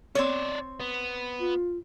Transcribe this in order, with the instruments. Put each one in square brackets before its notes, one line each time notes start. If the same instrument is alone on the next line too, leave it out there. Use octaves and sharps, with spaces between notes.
[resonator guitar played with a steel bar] C4 C#5 [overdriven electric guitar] C#4 D5
[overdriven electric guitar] B3
[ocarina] F4